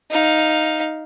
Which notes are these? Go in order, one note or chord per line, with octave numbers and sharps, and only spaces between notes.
D#4 F5